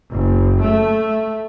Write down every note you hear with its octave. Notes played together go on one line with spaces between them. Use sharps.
F#1
A3